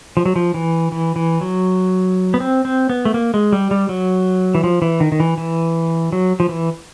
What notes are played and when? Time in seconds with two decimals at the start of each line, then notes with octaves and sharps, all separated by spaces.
0.17 F3
0.26 F#3
0.36 F3
0.54 E3
0.92 E3
1.16 E3
1.41 F#3
2.34 B3
2.40 C4
2.65 C4
2.89 B3
3.05 A3
3.14 A#3
3.34 G#3
3.52 G3
3.71 G3
3.89 F#3
4.55 E3
4.64 F3
4.82 E3
5.00 D#3
5.12 D#3
5.20 E3
5.38 E3
6.13 F#3
6.40 F3
6.49 E3